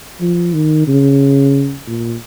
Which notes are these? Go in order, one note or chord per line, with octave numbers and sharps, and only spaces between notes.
F3
D#3
C#3
A#2